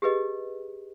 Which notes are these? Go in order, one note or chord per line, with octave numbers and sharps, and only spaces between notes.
G4 G#4 B4 D#5